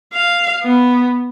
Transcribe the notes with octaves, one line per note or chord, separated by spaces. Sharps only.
F5
B3